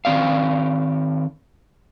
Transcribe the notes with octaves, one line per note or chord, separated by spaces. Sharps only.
D#3 F3 C4 D5 F5